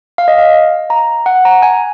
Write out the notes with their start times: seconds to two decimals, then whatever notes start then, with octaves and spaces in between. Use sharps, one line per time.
0.18 F5
0.28 D#5
0.38 F5
0.90 A#5
1.26 F#5
1.45 A#5
1.62 G#5